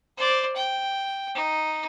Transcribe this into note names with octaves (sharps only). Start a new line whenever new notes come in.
C5 D5
G5
D#4